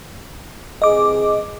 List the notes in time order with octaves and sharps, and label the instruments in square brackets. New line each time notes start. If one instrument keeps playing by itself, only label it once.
[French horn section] C3 E3 G#4 [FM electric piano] D#5 D6